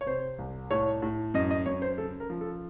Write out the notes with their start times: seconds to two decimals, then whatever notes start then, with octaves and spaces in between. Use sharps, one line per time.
0.01 C#5
0.06 C3 C5
0.38 C2
0.71 A2 C#5
1.02 A2
1.34 F#2 D#5
1.51 D#5
1.66 F#2 C#5
1.82 C5
1.98 C#3 A4
2.20 A#4
2.30 F3
2.41 A4